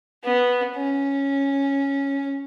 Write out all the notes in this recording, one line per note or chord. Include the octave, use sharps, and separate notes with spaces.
B3
C#4